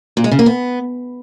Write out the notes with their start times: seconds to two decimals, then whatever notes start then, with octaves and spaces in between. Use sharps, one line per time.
0.17 A#2
0.24 G#3
0.31 C#3
0.39 A#3
0.46 B3